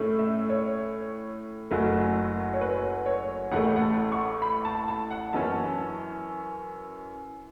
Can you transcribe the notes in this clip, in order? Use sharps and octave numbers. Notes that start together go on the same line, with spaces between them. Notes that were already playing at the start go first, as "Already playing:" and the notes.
Already playing: A2 A3 C#4
E5
C#5
F#1 F#2 F#3 A3
C#5
B4
C#5
A1 A2 A3 F#5
F#5
A5
C#6
B5
A5
A5
F#5
F#2 E3 C#4 A5